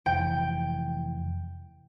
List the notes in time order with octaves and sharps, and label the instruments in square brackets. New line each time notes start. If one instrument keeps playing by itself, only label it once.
[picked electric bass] F1 E3 [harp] G5